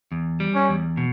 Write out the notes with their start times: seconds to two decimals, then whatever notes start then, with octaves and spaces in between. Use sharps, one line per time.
0.12 E2
0.40 G3
0.55 C#4
0.69 E2
0.97 B2